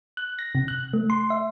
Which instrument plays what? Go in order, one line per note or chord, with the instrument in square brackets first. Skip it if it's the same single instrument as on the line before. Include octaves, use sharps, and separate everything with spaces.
[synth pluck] F#6
A#6
C3
F#6
A3
C6
E5